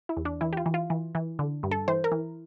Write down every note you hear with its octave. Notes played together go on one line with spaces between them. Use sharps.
E4
E2
D4
E3 E4
G4
F4
E3
F4
E3
E3
D3
G2
A4
E3 C5
A#4
E3